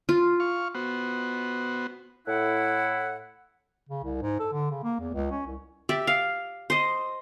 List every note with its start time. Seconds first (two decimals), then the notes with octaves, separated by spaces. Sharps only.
0.09 F4
0.40 F5 C#6
0.75 B3 F#4 C5
2.27 A2 E4 F#5
3.89 C#3
4.04 C2
4.22 G#2
4.39 A4
4.52 D3
4.71 C#3
4.84 A#3
4.99 E2
5.14 C#2
5.31 C#4
5.46 C2
5.89 G4 D5 E5
6.07 F5
6.70 C5 D#5